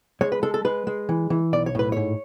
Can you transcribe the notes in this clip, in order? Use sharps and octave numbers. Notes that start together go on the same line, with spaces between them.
G#3 C#5
B4
G#3 A4
A4
G#3 B4
G#3
E3
E3
B1 D5
C#5
A2 B4
G#2 C#5